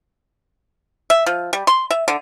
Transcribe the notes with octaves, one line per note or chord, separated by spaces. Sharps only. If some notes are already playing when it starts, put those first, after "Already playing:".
E5
F3
G3
C6
E5
D3